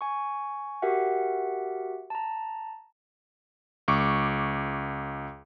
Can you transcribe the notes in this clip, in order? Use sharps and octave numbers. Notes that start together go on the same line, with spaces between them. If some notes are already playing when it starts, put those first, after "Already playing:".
G#5 C#6
F#4 G4 A#4 E5 F#5
A5 A#5
C#2 C#6 D6